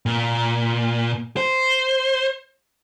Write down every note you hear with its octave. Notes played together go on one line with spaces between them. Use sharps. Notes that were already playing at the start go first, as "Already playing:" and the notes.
A#2
C5